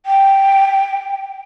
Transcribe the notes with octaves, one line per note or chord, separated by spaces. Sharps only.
G5